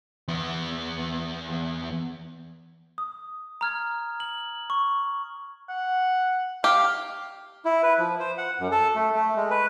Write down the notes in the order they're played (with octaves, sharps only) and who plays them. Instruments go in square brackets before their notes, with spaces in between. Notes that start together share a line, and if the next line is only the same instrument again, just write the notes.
[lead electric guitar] E2 B3
[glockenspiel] D#6
A#5 F6 G#6
F#7
C#6
[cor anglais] F#5
[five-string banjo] G4 [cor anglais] F5
[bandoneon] E4
B4
F3
C5
F#5
F#2
A4
A3
A3
G#3
B4